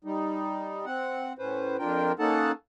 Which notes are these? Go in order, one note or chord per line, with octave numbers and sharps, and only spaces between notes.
G3 D#4
C4 F#5
A2 C#4 B4 C5
F2 D4 F4 A#4 G5
A#3 C#4 D#4 A4 F#5 A5